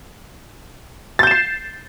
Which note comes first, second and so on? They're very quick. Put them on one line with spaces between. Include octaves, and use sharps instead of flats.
A6 G6 E7 C7